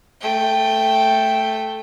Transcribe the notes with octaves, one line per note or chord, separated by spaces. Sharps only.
A3 G5